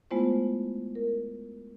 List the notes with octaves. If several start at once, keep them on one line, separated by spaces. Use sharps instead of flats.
G#3 A3 B3 E4 F4 C5
A#4